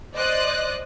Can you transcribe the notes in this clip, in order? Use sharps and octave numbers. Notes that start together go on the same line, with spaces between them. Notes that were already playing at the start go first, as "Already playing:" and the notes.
C5 D5 D#5 D#6 F#6